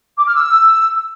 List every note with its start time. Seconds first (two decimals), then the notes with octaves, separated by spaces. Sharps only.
0.17 D6
0.26 F6
0.34 E6